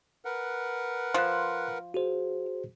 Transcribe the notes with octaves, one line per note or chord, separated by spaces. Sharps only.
A#4 B4 F#5
F3 C6 F#6
F#4 G#4 C5